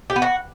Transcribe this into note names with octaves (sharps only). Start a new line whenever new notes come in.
G4
B3
F#4